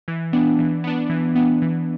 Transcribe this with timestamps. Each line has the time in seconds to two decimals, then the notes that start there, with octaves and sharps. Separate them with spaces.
0.08 E3
0.33 B3 D4
0.59 E3
0.84 B3 D4
1.10 E3
1.35 B3 D4
1.62 E3